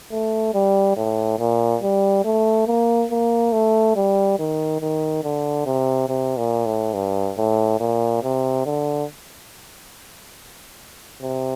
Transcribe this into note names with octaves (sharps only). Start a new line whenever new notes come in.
A3
G3
A2
A#2
G3
A3
A#3
A#3
A3
G3
D#3
D#3
D3
C3
C3
A#2
A2
G2
A2
A#2
C3
D3
C3